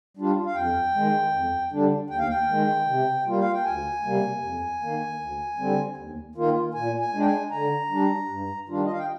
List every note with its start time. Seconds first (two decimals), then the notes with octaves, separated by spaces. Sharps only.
0.17 G3 D4 F4
0.46 F5
0.55 F2 G5
0.94 D#3 G#3
1.32 F2
1.71 D3 G3 D4
2.10 D#2 G5
2.19 F5
2.29 G5
2.49 D#3 G#3
2.87 C3
3.26 G3 A#3 F4
3.39 F5
3.52 G5
3.64 D2 G#5
4.04 C3 G3 A#3
4.42 F2
4.81 D#3 A#3
5.19 D2
5.58 D3 G3 C4
5.97 D#2
6.35 D#3 A#3 F4
6.74 A#2 G#5
7.01 G#5
7.13 G#3 D4
7.20 G5
7.25 G#5
7.51 D3 A#5
7.91 G3 D4
8.29 G2
8.68 D#3 G3 D4 F4
8.84 D#5
8.91 F5
8.98 G5